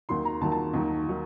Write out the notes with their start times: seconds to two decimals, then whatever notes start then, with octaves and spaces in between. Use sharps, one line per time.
0.09 D#2 D#3 F#3 C6
0.25 A#5
0.41 D#2 D#3 F#3 A5
0.52 A5
0.74 D#2 D#3 F#3
1.08 D#3 F#3